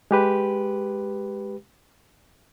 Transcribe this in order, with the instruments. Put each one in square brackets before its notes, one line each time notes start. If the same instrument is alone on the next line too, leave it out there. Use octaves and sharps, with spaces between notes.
[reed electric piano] G#3 G4 B4